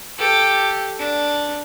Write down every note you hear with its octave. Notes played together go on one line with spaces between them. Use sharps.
G4 A4
D4